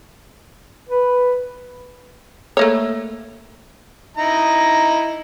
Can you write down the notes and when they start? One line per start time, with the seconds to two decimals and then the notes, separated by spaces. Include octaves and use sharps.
0.89 B4
2.57 A3 A#3 C#5
4.17 D#4 E4 A#5